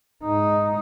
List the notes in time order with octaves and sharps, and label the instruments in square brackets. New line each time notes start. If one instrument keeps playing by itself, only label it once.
[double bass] G#2 D#4